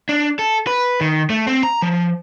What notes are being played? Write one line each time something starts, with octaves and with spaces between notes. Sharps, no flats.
D4
A4
B4
D#3
A3
C4
A#5
F3